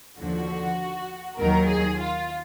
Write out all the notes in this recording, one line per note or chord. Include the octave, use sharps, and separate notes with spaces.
D#2 D3 F3 F#4
D#2 D#3 F#3 A#4
G#4
F4